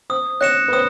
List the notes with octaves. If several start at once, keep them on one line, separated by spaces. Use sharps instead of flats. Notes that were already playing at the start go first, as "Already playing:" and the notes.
C5 D#6
C#5 F#6 A#6 C#7 E7
B4
C5 D#6